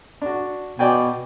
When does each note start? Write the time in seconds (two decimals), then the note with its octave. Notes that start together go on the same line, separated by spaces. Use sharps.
0.22 D4 F#4
0.79 B2 D5 G5 G#5